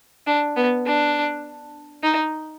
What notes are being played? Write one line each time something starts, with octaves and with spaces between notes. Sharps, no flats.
D4
B3
D4
D#4